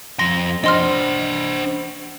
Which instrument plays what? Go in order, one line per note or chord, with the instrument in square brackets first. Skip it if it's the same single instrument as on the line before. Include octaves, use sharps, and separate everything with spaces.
[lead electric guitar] F2 C6 [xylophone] A#6
[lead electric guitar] D4 C5 [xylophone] D#5 C6 F6